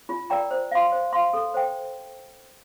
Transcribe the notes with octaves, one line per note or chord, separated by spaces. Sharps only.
F4
A#4 D5 G5 A#5
C5
F5 C6
C5
F5 C6
A4
C5 G5